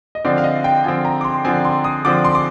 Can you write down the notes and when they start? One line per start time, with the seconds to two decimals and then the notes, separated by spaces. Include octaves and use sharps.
0.15 D#5
0.25 D3 F3 C4 D5
0.38 F5
0.44 D#5
0.64 G5
0.84 D3 F3 C4 G#5
1.05 A#5
1.21 D6
1.25 C6
1.44 D3 F3 C4 G#5
1.65 C6
1.84 D#6
2.05 D3 F3 C4 D6
2.25 C6
2.35 D6